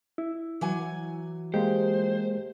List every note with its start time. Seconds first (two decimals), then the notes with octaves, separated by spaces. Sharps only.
0.18 E4
0.61 E3 F#3 G#5
1.54 G#3 A#3 G4 C5